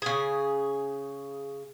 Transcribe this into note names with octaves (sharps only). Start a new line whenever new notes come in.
C#3 G#4